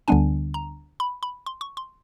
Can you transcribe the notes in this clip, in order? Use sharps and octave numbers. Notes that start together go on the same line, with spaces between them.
D2 D3 G3 B3 D4 G#5
A#5
B5
B5
C6
C#6
C6